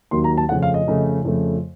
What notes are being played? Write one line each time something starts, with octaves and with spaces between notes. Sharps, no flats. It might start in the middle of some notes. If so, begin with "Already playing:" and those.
D#2 D#3 F#3 C6
A#5
A5
F2 C#3 A3 F#5
F5
D#5
F2 C#3 A3
F2 C#3 A3